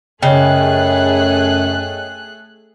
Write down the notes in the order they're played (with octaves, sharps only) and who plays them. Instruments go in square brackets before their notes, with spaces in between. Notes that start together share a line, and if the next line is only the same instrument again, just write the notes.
[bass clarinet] F#2 [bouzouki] C#3 [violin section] A3 G#4 F#6 [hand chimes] C#5 D#5 G5